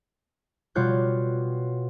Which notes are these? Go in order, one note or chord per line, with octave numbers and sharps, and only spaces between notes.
B2 G3 F4 C#5 F#6 G6